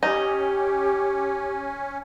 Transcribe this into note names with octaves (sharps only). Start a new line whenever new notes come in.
C#4 D#4 G4